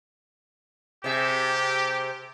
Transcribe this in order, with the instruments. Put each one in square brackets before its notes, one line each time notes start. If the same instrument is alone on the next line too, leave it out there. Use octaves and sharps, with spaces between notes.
[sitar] C3 G#4 E5 [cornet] G4